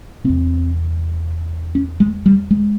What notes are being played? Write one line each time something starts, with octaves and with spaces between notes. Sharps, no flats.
E2 C3 C4
C#4
G#3
G3
G#3